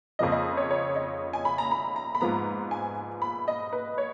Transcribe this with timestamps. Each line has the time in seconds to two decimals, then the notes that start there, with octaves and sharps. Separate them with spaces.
0.19 F2 C#3 F3 A#3 D#5
0.32 D#5
0.57 C#5
0.71 C#5
0.96 D#5
1.33 G#5
1.45 B5
1.58 A#5
1.71 B5
1.96 A#5
2.15 B5
2.21 G#2 F3 B3 A#5
2.71 G#5
3.22 B5
3.48 D#5
3.73 B4
3.98 C#5